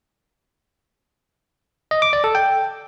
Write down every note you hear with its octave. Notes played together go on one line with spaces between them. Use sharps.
D#5
D6
D5
A4
G5